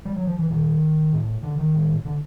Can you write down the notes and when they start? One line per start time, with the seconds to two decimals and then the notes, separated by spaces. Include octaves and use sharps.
0.05 G3
0.16 F#3
0.27 F3
0.39 E3
0.50 A#2 D#3
1.12 A2
1.43 D3
1.58 D#3
1.74 A2
2.05 D3